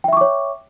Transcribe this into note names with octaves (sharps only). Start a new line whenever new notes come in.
C#5 E5 G5 C#6 D6